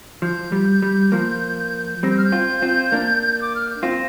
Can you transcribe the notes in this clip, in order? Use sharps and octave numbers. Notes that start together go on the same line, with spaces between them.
F3 G6
G3
G3
F3 A#3
G3 C4 A#6
G6
F6
G6
C4 F4
C4 F4
A#3 D4
D6
F6
G6
C4 F4 A#6